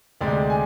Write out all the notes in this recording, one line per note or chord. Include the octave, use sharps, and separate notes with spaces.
D2 C3 G#3 C4 D5
G#5